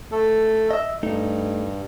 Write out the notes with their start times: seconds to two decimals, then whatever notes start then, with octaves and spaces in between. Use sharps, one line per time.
0.12 A3 A4
0.71 D#5 E5
1.03 G2 A3 D#4